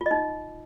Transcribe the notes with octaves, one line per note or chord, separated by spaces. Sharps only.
F4
D#5
D#4